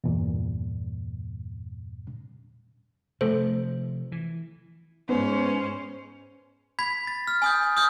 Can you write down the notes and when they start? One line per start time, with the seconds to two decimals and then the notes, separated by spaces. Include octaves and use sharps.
0.04 E2 G2 A#2
3.21 C3 F3 A3 A4 C5
4.12 E3
5.09 G#2 B3 C#4 C5
6.79 B5 G#6 B6
7.07 A6
7.27 F6
7.42 G#5 D#6 G6
7.77 D#6 F6 G6